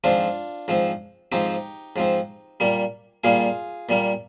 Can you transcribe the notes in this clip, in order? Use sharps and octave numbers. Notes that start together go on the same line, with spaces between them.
G#2 F3 C4 D4 F4
G#2 F3 C4
G#2 F3 C4 D#4 G4
G#2 F3 C4
A#2 G3 A#3
A#2 G3 A#3 F4 G#4
A#2 G3 A#3